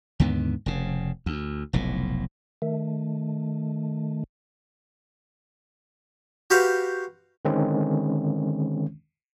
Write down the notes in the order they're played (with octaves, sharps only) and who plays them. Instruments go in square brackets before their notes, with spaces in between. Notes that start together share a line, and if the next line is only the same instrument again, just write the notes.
[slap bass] D#2 G#2 D3 B3
F1 C#3
D2
F1 B1 A2
[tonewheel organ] D#3 A3
[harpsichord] F#4 G4 B4 C5 F5
[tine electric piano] D3 D#3 G#3 C4 C#4